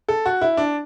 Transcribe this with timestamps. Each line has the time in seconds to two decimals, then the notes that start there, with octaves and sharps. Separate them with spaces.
0.09 A4
0.26 F#4
0.42 E4
0.57 D4